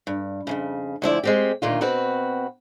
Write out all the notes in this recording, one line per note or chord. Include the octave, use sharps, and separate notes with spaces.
G2
F2 A2 C#3
D2 F3 E4 D5
G#3 C4 G4
D2 A#2 D#3 F4
B2 C4 F#4 B4